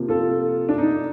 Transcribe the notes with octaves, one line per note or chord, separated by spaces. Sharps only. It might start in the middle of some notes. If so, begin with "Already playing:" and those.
Already playing: C3 F3 A#3
F4 A4
D4
D#4